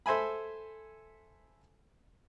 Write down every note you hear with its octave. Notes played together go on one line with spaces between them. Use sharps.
A4 C5 E5 G#5 B5